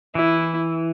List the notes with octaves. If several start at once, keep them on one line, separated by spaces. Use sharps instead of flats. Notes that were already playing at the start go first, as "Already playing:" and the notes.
E3 E4